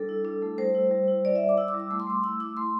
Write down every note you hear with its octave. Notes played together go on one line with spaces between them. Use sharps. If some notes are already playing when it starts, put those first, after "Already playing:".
Already playing: G3 D4 A4
E4
D4
A3
G3 C5
E4
G3
E4
G3 D5
E5
E4
D6
E4 E6
D6
G3
E6
A3 D6
C6
A3 D6
E4 E6
E4 D6
A3 C6